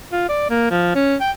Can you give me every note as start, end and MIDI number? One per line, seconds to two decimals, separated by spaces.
0.12 0.25 65
0.29 0.45 74
0.50 0.66 58
0.71 0.93 53
0.95 1.16 61
1.21 1.31 79